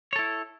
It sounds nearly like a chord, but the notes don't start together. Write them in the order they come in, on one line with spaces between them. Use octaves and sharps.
C#5 A4 E4